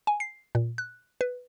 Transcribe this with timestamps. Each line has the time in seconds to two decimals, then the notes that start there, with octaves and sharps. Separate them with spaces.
0.07 G#5
0.20 C7
0.55 A#2
0.78 F#6
1.21 B4